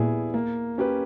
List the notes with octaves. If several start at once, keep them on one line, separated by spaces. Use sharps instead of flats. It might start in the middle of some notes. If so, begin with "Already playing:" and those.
Already playing: A#2 G3 B3 E4 G#4
A#3
C#4 G4 B4